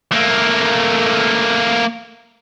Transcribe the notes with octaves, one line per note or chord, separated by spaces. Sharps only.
A3 A#3